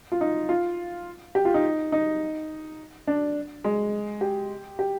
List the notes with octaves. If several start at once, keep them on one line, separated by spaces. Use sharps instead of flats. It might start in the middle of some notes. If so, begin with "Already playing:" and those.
F4
D#4
F4
G4
F4
D#4
D#4
D4
G#3
G4
G4